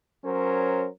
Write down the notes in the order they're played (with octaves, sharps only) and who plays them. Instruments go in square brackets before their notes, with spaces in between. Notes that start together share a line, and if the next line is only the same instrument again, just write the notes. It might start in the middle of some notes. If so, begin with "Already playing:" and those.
[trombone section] F#3 C#4 A#4 C5